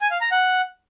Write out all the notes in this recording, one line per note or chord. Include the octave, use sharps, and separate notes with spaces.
G#5
F5
A#5
F#5